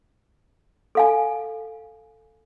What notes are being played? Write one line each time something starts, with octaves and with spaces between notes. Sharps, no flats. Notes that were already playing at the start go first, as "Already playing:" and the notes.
A4 F5 G#5